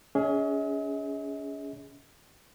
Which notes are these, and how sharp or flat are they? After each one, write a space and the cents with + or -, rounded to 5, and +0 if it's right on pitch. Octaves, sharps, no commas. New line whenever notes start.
C#4 +35 G#4 +0 D#5 +45